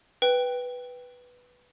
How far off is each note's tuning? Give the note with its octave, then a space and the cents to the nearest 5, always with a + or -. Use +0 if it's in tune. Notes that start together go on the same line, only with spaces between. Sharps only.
B4 +0 G5 +0